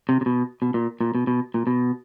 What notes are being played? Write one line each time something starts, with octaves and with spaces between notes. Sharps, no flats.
C3
C3
B2
B2
A#2
A#2
B2
B2
A#2
B2